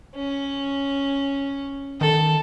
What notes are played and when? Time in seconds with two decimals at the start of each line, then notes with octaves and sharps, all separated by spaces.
0.15 C#4
2.01 D#3 A4